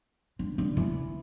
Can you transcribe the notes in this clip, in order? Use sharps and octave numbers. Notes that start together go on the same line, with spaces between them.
D3
D3
E3